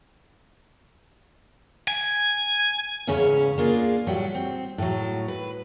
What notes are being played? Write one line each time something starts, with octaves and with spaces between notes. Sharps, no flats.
G#5
E2 G#2 C#3 C#4 C#5
A#3 D4 F4 G#4
A2 F#3 G3
C4
A2 F#3
B4